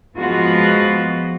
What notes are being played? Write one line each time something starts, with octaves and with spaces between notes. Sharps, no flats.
F3 G#3 B3 F4 F#4